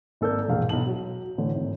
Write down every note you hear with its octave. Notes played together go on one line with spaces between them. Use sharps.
G#1 A#3 A4 A#4 D5 G6
E1 A#1 G#2 F5
B1 B2 A5 F#7
F#3
A2 D3 E3
G#1